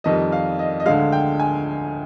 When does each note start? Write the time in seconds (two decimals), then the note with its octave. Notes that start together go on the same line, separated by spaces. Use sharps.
0.04 F2 D#3 G3 D#5
0.32 F5
0.59 D#5
0.80 D#5
0.86 D2 D3 G#3 F5
1.12 G5
1.39 G#5